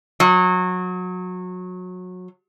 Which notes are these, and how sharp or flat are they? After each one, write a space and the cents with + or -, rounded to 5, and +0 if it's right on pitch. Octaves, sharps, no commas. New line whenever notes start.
F#3 -25